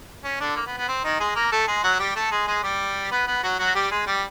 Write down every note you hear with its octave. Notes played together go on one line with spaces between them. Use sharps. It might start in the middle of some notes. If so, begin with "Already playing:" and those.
C#4
D3 D4
A#3
B3
B3
C4
D#3 D#4
G#3 G#4
A#3 A#4
A3 A4
G#3 G#4
F#3 F#4
G3 G4
A3 A4
G#3 G#4
G#3 G#4
G3 G4
B3 B4
B3 B4
F#3 F#4
F#3 F#4
G3 G4
G#3 G#4
G3 G4